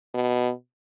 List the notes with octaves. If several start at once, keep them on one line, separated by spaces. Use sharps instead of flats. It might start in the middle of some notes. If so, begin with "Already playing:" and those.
B2